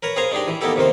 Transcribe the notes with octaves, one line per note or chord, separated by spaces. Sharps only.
A#4 B4 C#5 A#5
G#4 A#4 C5 F5 G#5 A#5
G#3 D4 D#4 G4
E3
A#3 B3 D#4 E4 G4 A4
D#2 C3 D#3 A#3 C5